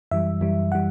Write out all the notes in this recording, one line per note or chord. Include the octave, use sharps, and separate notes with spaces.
F#2 E3 G3 E5
F#2 E3 G3
E3 G3 F#5